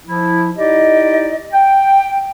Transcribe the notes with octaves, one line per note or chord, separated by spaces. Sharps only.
F3 E4
D#4 E4 G4 D5 D#5
G5